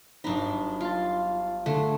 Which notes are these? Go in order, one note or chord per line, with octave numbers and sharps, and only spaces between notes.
G1 F#3 D4 D#4 B5
F4 F5 A5
D3 G#3 A3